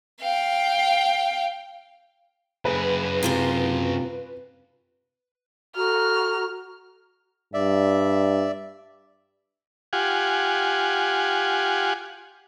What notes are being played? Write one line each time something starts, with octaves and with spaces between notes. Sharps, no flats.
F5 G5
F#2 G#4 B4
C3 F4 C5
F#4 A4 A#5 F6
G2 D5 E5
F4 G4 F#5 G#5